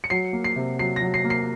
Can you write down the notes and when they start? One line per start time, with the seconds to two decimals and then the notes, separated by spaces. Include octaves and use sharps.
0.04 C#7
0.10 F#3 C7
0.33 A#3
0.44 C7
0.56 C3
0.79 F#3 C7
0.96 A#6
1.02 F#3
1.14 C7
1.24 A#3
1.30 C7